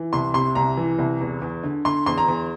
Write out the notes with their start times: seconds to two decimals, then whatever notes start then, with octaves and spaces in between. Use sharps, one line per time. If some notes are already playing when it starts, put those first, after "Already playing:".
Already playing: E3
0.13 C2 C6
0.34 C3 C6
0.55 C2 A#5
0.77 E3
0.99 C2
1.21 E2
1.42 E2
1.63 D3
1.85 D3 C6
2.06 E2 C6
2.18 A#5
2.28 E2